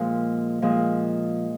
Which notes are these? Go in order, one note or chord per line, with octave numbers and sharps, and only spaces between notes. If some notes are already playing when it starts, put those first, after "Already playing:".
Already playing: A#2 F3 G#3
A#2 F3 G#3